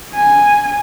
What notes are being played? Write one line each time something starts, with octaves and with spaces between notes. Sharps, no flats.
G#5